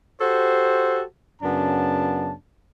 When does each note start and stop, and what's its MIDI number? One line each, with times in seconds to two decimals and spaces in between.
0.21 1.02 66
0.21 1.02 67
0.21 1.02 69
0.21 1.02 72
1.42 2.32 42
1.42 2.32 49
1.42 2.32 59
1.42 2.32 62
1.42 2.32 81